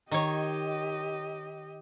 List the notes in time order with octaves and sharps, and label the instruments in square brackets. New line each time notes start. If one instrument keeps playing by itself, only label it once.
[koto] D#3 C#5 [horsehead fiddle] G4 D#5